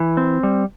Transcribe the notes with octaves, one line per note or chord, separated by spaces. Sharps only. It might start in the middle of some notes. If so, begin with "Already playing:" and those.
Already playing: E3
C4
G3